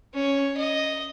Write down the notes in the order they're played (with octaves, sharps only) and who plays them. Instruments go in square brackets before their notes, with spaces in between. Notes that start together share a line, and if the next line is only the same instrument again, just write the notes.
[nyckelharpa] C#4 [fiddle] C#5
[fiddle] D#5